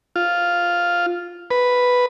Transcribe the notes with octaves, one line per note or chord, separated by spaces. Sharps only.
F4
B4